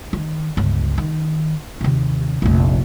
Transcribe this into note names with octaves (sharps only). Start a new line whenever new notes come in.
D#3
G1 C#2
D#3
D#2 C3
F1 A#1